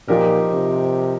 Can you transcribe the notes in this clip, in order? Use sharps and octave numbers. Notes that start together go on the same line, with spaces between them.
A#2 F3 D#4 G4 A#4
C3